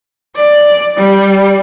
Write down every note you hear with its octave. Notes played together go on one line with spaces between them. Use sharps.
D5
G3